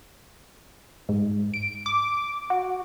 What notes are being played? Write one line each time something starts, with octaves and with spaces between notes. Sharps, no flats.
G#2
D7
D6
F#4